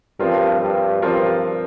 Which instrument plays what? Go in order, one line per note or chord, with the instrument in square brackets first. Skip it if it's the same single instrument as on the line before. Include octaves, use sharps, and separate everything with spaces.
[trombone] G2 [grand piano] F3 C4 F4 A#4
[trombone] G2
[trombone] G2 [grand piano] F3 C4 F4 A#4